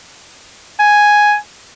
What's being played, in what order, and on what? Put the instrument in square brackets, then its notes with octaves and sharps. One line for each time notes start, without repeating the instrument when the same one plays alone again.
[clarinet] G#5